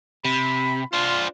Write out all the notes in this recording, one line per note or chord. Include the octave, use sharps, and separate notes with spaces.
C3 B5
D4 F4 C5